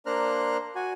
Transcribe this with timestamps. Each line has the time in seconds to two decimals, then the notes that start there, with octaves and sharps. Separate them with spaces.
0.06 A#3 D4 C5 A#5 F6 F#6
0.75 F#4 G#5